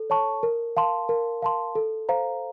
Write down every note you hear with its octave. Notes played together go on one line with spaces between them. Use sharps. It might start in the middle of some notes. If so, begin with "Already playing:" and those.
Already playing: A4
C#5 A5 C#6
A#4
F5 A5 C6
A#4
F5 A5 C6
A4
C5 F5 A#5